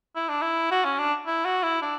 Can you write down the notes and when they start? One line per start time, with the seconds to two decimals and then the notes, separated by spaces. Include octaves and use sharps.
0.15 E4
0.29 D4
0.42 E4
0.71 F#4
0.85 C#4
0.99 D4
1.26 E4
1.45 F#4
1.63 E4
1.82 D4